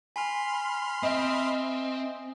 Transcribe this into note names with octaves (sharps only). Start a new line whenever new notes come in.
G#5 B5 C6 F6
C4 D#5 E5